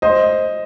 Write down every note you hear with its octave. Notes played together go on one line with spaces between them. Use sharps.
C5 D#5